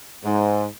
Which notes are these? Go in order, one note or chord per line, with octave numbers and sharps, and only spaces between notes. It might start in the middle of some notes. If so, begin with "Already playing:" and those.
G#2